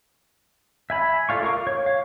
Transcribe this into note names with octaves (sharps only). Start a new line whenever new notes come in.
E5 G#5 B5
F4 A4 D5 F5 C#6
A#4 F5 C#6 D6
C#5
C#5 F5